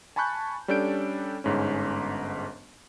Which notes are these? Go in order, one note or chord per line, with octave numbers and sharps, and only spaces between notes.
G#5 A5 B5 C#6 F#6 G6
G3 C#4 D4 A4 G6 D7
G1 G#2 C#4